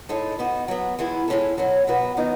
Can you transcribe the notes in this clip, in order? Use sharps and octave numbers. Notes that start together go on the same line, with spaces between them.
A2 G#3 D#4 A4 C#5
B3 D#4 F#4
F#3 B3 F#4
E3 G#3 B3 E4
E3 G#3 C#4 E4 A4
B2 F#3 C#4 F#4
B2 F#3 B3 F#4 B4
D#3 F#3 B3 D#4